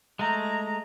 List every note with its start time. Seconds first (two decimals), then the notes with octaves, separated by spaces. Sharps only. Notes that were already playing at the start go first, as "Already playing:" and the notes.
0.19 G#3 A3 A#5